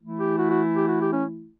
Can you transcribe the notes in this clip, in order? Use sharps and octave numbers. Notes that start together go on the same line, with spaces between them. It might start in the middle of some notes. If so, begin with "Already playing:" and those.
E3 A3 E4
G4
F#4
F#4
G4
F#4
G4
C#4